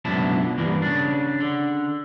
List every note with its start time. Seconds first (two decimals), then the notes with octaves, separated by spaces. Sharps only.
0.05 C#2 F#2 B2 D3 E4 A5
0.58 G2 E3 A#3
0.82 C#3 D4
1.40 D3